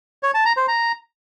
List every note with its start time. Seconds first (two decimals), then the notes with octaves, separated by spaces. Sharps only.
0.23 C#5
0.34 A5
0.45 A#5
0.57 C5
0.68 A#5